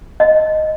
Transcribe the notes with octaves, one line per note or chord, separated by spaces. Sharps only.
D#5